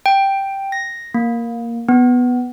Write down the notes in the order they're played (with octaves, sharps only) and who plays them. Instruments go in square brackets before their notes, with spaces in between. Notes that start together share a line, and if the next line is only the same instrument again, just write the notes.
[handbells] G5
A#6
A#3
B3